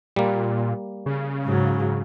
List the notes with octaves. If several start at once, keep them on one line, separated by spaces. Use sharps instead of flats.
A#2 G3 A#3
C#3
G#2 F#3